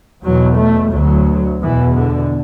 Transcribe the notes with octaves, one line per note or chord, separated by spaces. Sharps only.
E2 B2 F#3
A3
D2 F#3
E2 B2 E3
D3